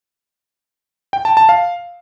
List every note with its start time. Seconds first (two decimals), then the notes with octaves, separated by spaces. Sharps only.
1.13 G5
1.25 A5
1.37 A5
1.49 F5